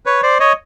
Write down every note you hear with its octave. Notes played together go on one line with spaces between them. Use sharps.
B4 C#5
C5 D5
C#5 D#5